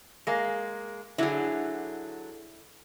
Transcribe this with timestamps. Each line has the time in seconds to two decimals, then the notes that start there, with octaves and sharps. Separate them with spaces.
0.27 G#3 A#3
1.18 D3 F#3 E4 G#4